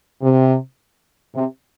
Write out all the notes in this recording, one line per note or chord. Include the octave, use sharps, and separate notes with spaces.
C3
C3